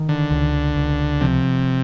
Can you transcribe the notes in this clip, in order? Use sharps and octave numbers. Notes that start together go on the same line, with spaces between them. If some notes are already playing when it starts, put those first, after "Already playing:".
Already playing: D#3
D3
C#2
C#2
C3 F3